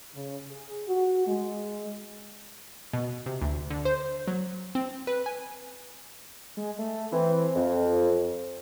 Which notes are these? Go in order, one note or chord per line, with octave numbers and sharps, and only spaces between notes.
C#3
G#4
F#4
G#3
B2
C3
D2
D3
C5
F#3
C4
B4
G#5
G#3
A3
E3 C4
F2